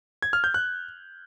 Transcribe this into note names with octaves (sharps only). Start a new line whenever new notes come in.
G#6
F6
G6
F#6